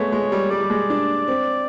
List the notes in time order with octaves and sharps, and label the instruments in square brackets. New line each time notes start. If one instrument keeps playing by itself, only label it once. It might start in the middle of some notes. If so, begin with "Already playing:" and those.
Already playing: [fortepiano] G#3 A3 B3 [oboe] C#5
[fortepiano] G#3
G3
[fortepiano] G3 [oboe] D5
[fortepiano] G3
G#3
D4
C4